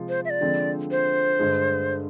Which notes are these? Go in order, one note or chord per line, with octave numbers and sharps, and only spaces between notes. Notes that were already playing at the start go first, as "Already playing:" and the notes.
Already playing: C3 F3 G#3
C5
E5
D5
D3 F3 G#3 C4
C5
G2 D3 G#3